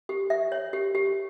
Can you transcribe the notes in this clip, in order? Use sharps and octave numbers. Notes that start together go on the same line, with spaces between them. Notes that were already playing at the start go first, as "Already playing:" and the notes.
G4
E5
C#5
G4
G4